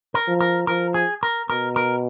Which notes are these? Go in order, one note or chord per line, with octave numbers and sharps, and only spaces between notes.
A#4
F3
A#4
F3 A#4
G#4
A#4
B2 A#4
A#4